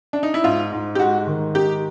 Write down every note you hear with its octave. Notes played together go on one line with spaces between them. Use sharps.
D4
D#4
E4
G#2 F4
G#2
G4
G#3 F#4
D#3
D#4 G4